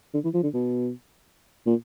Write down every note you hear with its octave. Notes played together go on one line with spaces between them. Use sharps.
D3
E3
F3
D3
B2
A#2